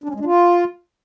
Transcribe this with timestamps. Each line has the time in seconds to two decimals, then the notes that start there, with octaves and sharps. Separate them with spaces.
0.04 D4
0.09 C#4
0.14 G#3
0.20 D4
0.25 F4